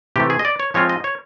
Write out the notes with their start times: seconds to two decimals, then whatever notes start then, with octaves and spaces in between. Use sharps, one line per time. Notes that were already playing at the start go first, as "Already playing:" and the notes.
0.16 C3 E3 A3 G4
0.30 G#4
0.39 D#5
0.45 D5
0.60 C#5
0.74 F3 G#3 C4 F4 C#5
0.89 D#5
1.04 C#5